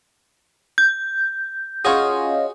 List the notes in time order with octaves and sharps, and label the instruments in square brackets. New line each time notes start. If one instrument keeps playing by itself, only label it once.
[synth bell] G6
[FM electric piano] C#4 F4 D#5 [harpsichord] F#4 G#4 C#5